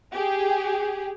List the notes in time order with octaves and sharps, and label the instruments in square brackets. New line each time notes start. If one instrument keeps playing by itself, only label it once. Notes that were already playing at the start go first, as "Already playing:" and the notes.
[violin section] G4 G#4